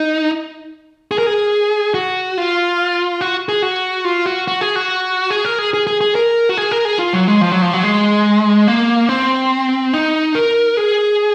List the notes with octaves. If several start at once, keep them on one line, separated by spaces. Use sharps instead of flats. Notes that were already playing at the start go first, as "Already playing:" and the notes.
Already playing: D#4
G#4
A#4
G#4
F#4
F4
F#4
G#4
F#4
F4
F#4
F#4
G#4
F#4
G#4
A#4
G#4
G#4
G#4
G#4
A#4
F#4
G#4
A#4
G#4
F4
F#3
G#3
F3
F#3
F3
F#3
G#3
A#3
C4
D#4
A#4
G#4